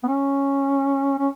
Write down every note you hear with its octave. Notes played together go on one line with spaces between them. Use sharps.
B3
C#4
C#4